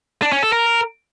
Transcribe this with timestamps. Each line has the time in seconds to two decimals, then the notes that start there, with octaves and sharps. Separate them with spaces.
0.22 D4
0.32 C#4
0.42 A4
0.53 A#4